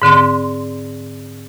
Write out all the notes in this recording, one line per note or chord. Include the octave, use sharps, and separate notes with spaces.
G#2 D3 C4 C6